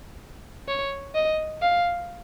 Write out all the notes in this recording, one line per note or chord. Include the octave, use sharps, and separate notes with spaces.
C#5
D#5
F5